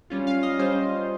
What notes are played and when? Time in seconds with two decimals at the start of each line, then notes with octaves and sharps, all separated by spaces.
0.10 G3 C#4 F4
0.27 F5
0.43 D#5
0.59 G3 C#4 F4 C5